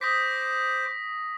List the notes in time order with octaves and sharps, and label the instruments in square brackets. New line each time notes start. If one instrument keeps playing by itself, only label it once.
[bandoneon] C5 D6 [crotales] D#6 A#6 B6